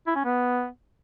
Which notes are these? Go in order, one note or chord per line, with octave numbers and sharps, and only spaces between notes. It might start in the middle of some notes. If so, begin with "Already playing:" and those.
E4
C#4
B3